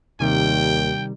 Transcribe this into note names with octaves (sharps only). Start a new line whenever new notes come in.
D#2 C3 D#3 G3 G5